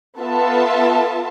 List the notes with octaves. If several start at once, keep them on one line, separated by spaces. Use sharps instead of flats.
B3 F4 A4 E5 A5